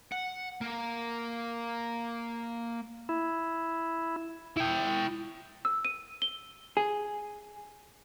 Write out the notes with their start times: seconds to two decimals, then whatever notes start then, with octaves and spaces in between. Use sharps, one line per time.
0.12 F#5
0.61 A#3
3.09 E4
4.57 E4 G5
5.65 E6
5.85 D#7
6.22 G7
6.77 G#4